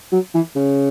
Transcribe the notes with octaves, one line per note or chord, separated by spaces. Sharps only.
F#3
E3
C#3